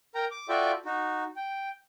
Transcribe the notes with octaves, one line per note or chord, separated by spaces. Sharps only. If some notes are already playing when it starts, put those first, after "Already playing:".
A#4 G5 A#5
D6
F4 F#4 A4 D5 E5 G5
D#4 F#4
G5